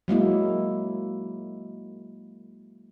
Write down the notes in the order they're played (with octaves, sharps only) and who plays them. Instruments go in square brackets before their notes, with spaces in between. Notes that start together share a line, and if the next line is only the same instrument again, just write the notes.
[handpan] F#3 G#3 A#3 E4